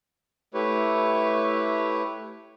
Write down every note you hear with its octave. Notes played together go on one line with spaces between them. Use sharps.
A3 E4 G4 B4 C#5